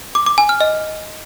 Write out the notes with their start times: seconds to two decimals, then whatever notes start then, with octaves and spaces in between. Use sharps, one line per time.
0.15 D6
0.26 D6
0.38 G#5
0.49 F6
0.61 D#5